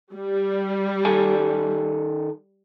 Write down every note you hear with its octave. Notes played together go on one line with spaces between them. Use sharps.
G3
D#3 A4 G#5